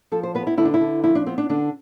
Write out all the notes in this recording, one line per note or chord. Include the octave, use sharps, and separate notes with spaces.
F3 A4
C5
B3 B4
E4
D3 E4
D4
E4
D3
F3 E4
D4
B3 C4
D4
D3 D4